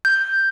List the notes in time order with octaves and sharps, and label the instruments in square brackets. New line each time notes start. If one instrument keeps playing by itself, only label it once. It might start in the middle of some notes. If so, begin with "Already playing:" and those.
[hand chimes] G6